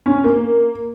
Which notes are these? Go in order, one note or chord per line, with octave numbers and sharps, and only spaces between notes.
C#4
A#3